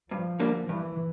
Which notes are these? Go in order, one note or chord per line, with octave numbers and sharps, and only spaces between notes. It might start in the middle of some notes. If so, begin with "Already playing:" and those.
G2 F3
D3 G3 A#3 D4
G2 E3